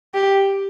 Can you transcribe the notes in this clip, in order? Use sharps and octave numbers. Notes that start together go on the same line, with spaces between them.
G4